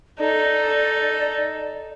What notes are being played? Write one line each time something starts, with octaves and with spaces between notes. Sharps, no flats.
D#4 A4 D5